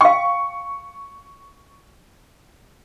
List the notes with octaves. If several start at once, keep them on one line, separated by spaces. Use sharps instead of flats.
F5 G5 C#6